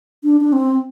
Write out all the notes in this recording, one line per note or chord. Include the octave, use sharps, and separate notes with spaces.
D4
D4
C4